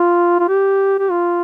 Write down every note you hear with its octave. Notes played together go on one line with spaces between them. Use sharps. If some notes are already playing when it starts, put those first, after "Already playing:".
Already playing: F4
F4
G4
G4
F4